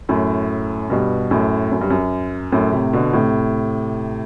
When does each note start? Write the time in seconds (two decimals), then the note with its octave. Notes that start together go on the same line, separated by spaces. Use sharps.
0.09 F#2 A2
0.90 G2 B2
1.31 F#2 A2
1.71 F#2
1.81 G2
1.90 F#2
2.52 F#2 A2
2.72 A2 C3
2.93 B2 D3
3.13 A2 C3